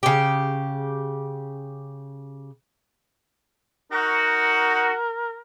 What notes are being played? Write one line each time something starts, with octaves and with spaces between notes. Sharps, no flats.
C#3 G4
D#4 F#4 A#4